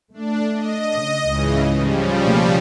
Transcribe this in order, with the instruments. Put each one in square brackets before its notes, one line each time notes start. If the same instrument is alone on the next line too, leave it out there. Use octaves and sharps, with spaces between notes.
[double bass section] A3 [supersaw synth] D4
[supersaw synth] D#5
[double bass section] C#3
[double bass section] C#2 G#2 [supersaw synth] C#3 E3
[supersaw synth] C#3 F3 G3
[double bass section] B2 A3 A#3